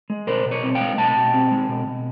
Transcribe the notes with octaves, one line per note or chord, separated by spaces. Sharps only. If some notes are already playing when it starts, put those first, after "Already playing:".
G#3
B2 A#4 C5
B2
B4 C#5
C4
F5 G5
G#3
B2 G5 A5
B2
C4
G#3
B2
B2